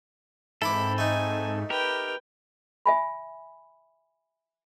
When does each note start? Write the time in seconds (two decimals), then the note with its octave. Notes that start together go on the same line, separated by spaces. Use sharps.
0.62 G#2 C4 E4 A4 B4 B5 D6
0.98 A3 D#4 G#5
1.70 G4 A#4 B4 G5
2.86 E5 G#5 B5